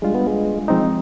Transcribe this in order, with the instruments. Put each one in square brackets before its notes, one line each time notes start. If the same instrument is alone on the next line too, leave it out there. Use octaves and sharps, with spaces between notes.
[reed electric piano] G3 D4 F4 [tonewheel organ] G#3
[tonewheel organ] B3
G#3
[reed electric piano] F3 G#3 C4 D#4